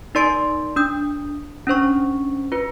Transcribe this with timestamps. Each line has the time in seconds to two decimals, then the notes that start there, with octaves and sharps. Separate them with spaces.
0.15 D#4 A#4 D5 C6 A6 D7
0.76 D4 D#6 G6
1.67 C#4 D4 C5 C#6
2.52 F4 B4